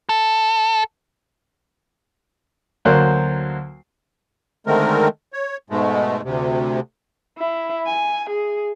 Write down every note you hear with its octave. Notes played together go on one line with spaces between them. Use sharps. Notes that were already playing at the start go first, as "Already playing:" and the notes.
A4
D2 F#3 A#3 C5 F#6
D3 D#3 G#3 A3 C4 A#4
C#5
G#2 B2 G#3 A3
D2 C3
E4
G#5
G#4